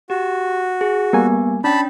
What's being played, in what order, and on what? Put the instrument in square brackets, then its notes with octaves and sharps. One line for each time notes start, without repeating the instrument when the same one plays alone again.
[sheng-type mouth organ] F#4 [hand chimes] G4
[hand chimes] G#4
[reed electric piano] G3 A#3 G#5 [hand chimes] B3
[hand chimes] C#4 G5 [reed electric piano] D4 [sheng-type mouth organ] A5 B5